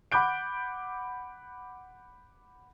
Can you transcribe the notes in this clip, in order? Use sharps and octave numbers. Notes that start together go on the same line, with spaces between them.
F#5 B5 D6 F#6 G6 D7